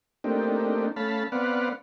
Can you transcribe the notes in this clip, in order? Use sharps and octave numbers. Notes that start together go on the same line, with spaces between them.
A3 A#3 C4 D4 D#4 G4
A3 C#4 F5 A5 B5
B3 C4 B4 D5 F5 F#5